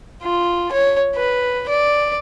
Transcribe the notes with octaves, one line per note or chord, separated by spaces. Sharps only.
F4
C#5
B4
D5